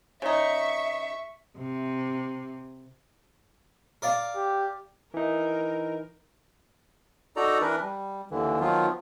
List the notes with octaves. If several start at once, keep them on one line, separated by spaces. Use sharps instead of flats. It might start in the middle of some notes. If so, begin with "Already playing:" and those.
C#3 D#4 E5 C#6
C3
A#4 D5 F5
G4
E3 D#4 A#4
D#4 F#4 A4 D5 A#5
E3 D4 A#4 B4
G3
D#2 D3 E3
D#3 F3 F#3 B3 F4